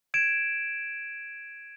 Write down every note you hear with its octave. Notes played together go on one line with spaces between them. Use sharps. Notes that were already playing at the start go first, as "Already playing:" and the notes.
G#6 D7 E7